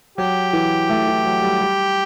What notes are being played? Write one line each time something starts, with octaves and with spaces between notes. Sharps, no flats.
F#3 G4
E3
A3
E3
F#3
G3
G3